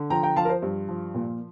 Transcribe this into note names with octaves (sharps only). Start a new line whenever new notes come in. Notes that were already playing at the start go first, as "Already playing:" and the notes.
Already playing: D3
F3 G5 A#5
G5 A#5
F3 F5 A5
A#4
C5
G2
F3
A#2